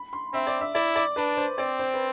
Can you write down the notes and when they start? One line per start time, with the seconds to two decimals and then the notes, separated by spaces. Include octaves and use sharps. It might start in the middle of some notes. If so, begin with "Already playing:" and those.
Already playing: B5
0.13 C6
0.33 C4 E5
0.47 D5
0.61 E5
0.75 E4 D5
0.96 D5
1.16 D4 B4
1.37 C5
1.58 C4 D5
1.79 C5
1.94 B4